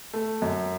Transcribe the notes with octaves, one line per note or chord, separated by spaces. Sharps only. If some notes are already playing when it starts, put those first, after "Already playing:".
A3
F#2